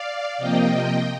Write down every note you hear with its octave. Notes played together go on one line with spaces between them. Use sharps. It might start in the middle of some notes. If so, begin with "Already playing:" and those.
Already playing: D5 F5
C3 F3 A#3 D#5 G5